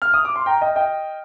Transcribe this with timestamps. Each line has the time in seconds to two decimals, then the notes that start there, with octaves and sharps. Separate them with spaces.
0.02 F6
0.14 D#6
0.25 D6
0.36 C6
0.46 G5 A#5
0.61 D#5 G5
0.76 D#5 G5